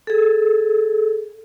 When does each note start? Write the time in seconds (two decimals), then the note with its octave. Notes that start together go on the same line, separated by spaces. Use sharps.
0.07 G#4 A4